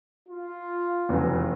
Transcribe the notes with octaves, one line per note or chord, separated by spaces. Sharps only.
F4
F1 E2 C#3 F#3